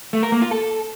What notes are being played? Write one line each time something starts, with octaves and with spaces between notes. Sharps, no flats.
A3
A#4
A#3
F4
A4